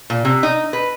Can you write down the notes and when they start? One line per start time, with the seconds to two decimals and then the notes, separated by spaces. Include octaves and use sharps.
0.10 A#2
0.25 C3
0.43 D#4
0.73 B4